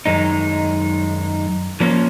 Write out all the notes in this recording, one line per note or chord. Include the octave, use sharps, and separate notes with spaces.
F#2 D#3 G#3 D#4
F3 A#3 C#4